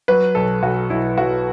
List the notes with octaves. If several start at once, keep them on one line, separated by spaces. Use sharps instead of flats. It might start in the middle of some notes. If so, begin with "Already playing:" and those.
F#3 B4
B1 A4
B1 F#4
B1 E4
B1 F#4